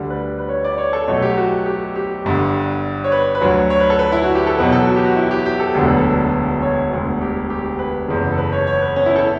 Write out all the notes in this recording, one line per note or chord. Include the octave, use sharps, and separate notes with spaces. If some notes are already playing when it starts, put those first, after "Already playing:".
Already playing: D2 D3 G3
B4
B4
C#5
D5
C#5
A4
B1 B2 F#3 A3 C#5
G4
F#4
G4
G4
G1 G2 D3
C#5
B4
B4
D2 D3 F#3 C#5
C#5
B4
A4
B4
E4
F#4
G4
A4
E2 B2 F#3 B4
A4
F#4
G4
F#4
E4
G4
G4
A4
E1 D2 D3 F#3 A4
B4
A4
C#5
E1 D2 D3
G4
G4
B4
F#1 E2 C#3
A4
B4
C#5
C#5
B4
C#4
E4
A4